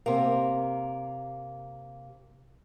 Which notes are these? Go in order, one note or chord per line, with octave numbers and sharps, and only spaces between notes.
C3 A#3